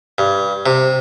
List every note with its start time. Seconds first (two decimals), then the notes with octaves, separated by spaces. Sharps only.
0.18 G2
0.66 C3